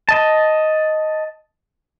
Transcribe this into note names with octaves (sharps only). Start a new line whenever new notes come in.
D#5 A5